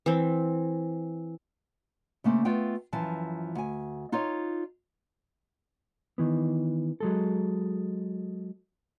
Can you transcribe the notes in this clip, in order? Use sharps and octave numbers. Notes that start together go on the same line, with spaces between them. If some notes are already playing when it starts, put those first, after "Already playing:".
E3 C4
C#3 A3 A#3 C4
A3 B3 F4 G5
F#2 E3 F3 A5
D2 G#5
D#4 F4 A4 C#5
D#3 E3 B3
F#3 G#3 A4